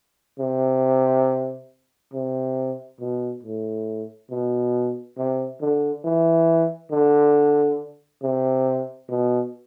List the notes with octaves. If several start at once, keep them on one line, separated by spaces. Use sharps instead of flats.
C3
C3
B2
A2
B2
C3
D3
E3
D3
C3
B2